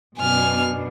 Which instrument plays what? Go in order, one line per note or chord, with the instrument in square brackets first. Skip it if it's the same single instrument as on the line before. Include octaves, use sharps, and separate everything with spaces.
[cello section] F#2 B2 D4 [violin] G#5 F6